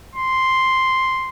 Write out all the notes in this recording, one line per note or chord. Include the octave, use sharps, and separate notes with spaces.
C6